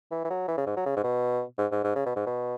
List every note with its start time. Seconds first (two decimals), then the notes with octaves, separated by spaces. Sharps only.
0.11 E3
0.25 E3
0.30 F#3
0.48 E3
0.58 C#3
0.67 G#2
0.77 F#3
0.86 C#3
0.97 G#2
1.04 B2
1.58 G#2
1.72 G#2
1.84 G#2
1.96 C#3
2.06 B2
2.16 G#2
2.27 B2